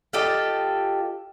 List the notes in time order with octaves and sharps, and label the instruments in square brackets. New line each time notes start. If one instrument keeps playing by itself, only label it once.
[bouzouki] F4 G4 A4 D#5